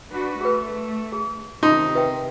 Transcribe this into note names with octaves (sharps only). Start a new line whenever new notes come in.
D4 F#4 B4
A3 G#4 B4
G#4
C3 D#3 D#4 F4 A5 C6
B4 E5 G5